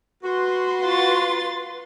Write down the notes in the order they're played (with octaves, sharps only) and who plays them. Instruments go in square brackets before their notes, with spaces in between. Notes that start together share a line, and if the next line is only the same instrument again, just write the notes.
[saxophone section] F#4 [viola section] B4 C6
[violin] F4 A6